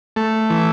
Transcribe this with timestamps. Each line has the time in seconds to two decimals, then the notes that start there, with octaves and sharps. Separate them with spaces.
0.16 A3
0.50 E3